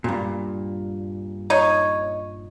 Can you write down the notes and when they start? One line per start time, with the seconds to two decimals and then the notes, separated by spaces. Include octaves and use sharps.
0.04 G2 A#2
1.50 D#4 C#5